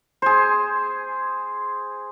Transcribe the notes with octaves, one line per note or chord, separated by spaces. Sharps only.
G#4 C5